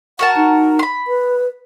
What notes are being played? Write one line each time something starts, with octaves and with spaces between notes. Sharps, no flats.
F#4 A#4 F#5 A5
D#4
B5 C6
B4